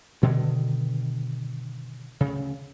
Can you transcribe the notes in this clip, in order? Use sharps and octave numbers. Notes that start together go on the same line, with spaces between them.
G2 B2 D3 D#3
D2 C#3